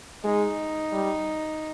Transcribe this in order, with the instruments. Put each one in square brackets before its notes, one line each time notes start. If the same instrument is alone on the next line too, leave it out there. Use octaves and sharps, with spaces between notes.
[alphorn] G#3 [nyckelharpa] D#4
[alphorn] G3